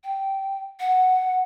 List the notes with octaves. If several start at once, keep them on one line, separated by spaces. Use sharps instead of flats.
G5
F#5